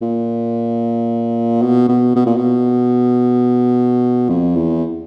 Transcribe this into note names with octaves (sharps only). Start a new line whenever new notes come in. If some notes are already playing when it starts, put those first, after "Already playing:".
A#2
B2
B2
B2
A#2
B2
F2
E2